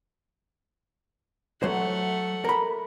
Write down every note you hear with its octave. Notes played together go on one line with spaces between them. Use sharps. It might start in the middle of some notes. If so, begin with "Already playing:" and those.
F#3 A3 C5 F#5
A#4 B5